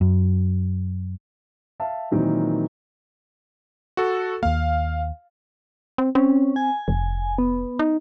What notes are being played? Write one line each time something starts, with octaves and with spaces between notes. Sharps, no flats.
F#2
E5 F5 A5
A#2 D#3 E3 F#3 C4
F#4 A4
D#2 A#3 F5
C4
C4 C#4
G#5
F1
B3
D#4